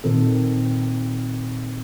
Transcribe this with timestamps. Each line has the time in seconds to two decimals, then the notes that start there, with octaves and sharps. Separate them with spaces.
0.04 A#2 D#3 C4 A4